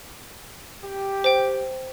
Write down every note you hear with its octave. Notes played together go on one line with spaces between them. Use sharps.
G4
C5 G5